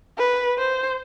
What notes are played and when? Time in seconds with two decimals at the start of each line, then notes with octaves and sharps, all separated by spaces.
0.18 B4
0.59 C5